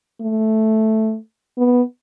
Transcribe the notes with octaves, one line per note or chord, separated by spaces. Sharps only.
A3
B3